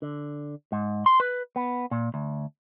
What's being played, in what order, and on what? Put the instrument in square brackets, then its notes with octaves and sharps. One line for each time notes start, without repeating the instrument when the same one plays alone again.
[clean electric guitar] D3
G#2
C6
B4
B3
A#2
D2